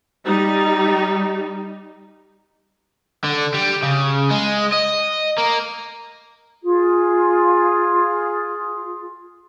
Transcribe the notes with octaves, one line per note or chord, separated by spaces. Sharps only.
G3 D#4
D3
G3
C#3
G#3
D#5
A#3
F4 G#4